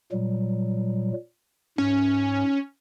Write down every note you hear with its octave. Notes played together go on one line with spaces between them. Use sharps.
A#2 F#3 G3
G#2 C#4